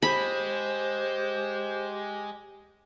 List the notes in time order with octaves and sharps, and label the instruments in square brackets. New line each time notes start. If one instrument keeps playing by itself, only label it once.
[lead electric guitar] G#3 G#4 [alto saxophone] G4 [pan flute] C5 [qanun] B5